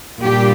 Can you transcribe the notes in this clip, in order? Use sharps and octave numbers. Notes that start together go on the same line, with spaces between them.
A#2 G3 A#3 D4 G4